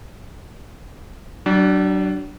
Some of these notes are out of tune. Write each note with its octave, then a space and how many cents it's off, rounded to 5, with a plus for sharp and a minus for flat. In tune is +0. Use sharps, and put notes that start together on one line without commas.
F#3 +40 D4 +0